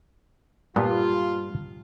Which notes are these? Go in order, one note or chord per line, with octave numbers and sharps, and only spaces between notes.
G2 A#2 B3 F4